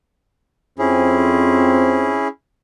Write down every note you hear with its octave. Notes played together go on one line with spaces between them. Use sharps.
F2 C4 C#4 E4 G#4